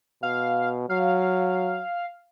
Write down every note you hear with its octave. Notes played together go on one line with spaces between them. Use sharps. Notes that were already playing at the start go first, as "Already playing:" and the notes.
B2 F5
F#3 F5